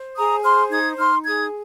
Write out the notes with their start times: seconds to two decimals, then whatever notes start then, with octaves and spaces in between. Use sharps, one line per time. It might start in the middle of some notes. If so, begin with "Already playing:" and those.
Already playing: C5
0.16 G#4 A#5 D#6
0.43 C5 C6 F6
0.70 D#4 D#6 G#6
0.97 D#4 C6 F6
1.25 G#4 D#6 G#6